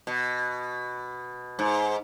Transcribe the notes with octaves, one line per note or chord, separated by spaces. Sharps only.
B2
G#2